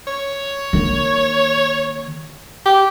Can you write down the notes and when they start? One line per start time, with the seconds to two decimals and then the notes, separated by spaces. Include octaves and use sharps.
0.07 C#5
0.73 D#3 A#3
2.65 G4